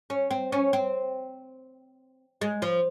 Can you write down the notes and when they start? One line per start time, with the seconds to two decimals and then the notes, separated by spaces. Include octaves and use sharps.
0.10 C#4
0.31 C4
0.52 C#4
0.73 C4
2.41 G#3
2.62 F3